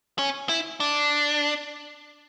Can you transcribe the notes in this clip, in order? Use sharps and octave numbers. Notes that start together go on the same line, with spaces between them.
C#4
E4
D4